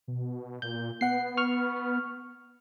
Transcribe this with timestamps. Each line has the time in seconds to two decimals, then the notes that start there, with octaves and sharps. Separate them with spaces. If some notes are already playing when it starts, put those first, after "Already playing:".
0.08 B2
0.62 A#2 G6
1.01 B3 F#5 C7
1.37 C#6 F6